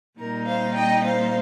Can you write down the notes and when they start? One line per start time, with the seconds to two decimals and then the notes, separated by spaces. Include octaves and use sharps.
0.19 A#2 G3 C4 D#4 A#4
0.47 C5 F5
0.75 D#5 G5
1.04 C5 F5